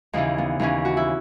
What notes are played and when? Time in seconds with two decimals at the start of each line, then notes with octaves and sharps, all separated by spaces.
0.13 D#2 C#3 E3 D#4
0.38 B3
0.60 D#2 C#3 E3 C#4
0.85 F#4
0.97 E4